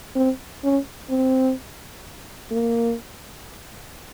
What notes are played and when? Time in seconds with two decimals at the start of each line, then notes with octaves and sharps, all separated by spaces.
0.15 C4
0.64 C#4
1.10 C4
2.51 A#3